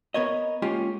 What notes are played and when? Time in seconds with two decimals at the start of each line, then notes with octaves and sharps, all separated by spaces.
0.14 B3 A#4 C#5 D#5
0.62 G#3 A#3 C#4 F4 G4